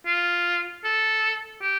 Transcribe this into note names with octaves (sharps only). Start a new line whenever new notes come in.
F4
A4
G4